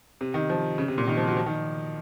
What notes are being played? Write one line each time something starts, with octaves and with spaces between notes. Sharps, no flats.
C3
D#3
F3
C#3
C3
A#2
D#3
F3
F#3
F3
D#3